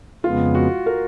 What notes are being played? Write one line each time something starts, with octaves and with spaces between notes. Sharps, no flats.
F2 C#3 G#3 B3 F4
F#4
A#4